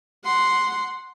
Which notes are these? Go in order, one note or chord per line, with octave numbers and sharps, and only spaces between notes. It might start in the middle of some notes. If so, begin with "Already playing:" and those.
F#5 C6